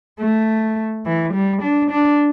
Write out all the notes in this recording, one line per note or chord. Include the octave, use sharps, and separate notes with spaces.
A3
E3
G3
D4
D4